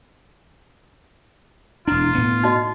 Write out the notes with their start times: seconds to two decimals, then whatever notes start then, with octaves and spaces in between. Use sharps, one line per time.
1.87 E1 D4 E4 F4
2.15 A2 B3
2.43 D#4 F#4 D#5